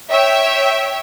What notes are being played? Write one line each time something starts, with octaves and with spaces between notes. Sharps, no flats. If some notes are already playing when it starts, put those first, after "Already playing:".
C#5 E5 G5